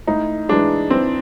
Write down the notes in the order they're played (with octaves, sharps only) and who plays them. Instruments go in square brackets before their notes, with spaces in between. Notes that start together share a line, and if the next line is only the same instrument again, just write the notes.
[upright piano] A2 [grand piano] D#4
[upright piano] E3 G#3 [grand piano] D4
[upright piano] E3 [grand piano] C4